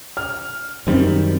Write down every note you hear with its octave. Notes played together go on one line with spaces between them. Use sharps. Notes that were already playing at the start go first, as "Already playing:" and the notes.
F6
F#2 D#3 G3 C4